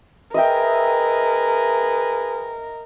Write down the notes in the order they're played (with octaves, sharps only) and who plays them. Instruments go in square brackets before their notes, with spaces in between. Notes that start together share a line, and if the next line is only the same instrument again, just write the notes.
[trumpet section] G#4 B4 [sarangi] A#4 [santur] D#5 E5 G5